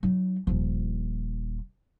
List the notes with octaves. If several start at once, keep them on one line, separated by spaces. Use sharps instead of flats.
F#3 D#4
D#1 F3